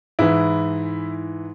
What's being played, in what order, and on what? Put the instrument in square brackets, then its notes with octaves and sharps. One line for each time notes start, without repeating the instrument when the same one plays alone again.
[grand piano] G#2 E3 E4